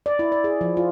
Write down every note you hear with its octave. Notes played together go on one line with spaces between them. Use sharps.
D5
E4
D5
G#4
F3
F4